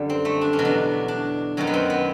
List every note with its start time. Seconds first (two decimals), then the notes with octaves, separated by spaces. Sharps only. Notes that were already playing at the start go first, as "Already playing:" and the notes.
Already playing: F#2 D3 G3
0.10 C4
0.25 A3
0.41 D4
0.53 C#4
0.59 E2 B2 F#3
0.65 D4
1.08 D4
1.57 F#2 D#3 F#3 C#4
1.67 B3
1.74 C4
1.90 B3